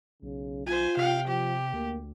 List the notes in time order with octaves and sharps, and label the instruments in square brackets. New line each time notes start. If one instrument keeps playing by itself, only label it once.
[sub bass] B1 [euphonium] C#3
[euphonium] F4 [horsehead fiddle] C5 G#5
[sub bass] C3 [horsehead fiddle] F5 G5
[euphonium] F3 [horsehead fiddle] G4
[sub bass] D2 [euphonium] A#3